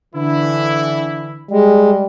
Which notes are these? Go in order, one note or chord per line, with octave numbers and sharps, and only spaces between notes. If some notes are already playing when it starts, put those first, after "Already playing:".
D3 E3 E4
G3 G#3